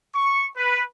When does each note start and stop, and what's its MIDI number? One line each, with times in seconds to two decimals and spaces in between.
0.15 0.46 85
0.57 0.83 71